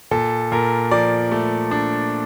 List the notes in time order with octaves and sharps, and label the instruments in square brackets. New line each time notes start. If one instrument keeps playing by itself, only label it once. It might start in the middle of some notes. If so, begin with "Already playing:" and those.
[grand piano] A#2 A4
A#2 A#4
F3 D5
A3
D4